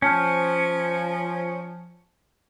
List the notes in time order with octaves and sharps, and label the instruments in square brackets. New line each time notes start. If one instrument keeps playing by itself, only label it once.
[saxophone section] F3 [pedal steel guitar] C#4 [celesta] A5 F6 G6